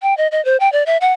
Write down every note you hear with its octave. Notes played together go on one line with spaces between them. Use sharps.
G5
D#5
D#5
C5
G5
D5
E5
F#5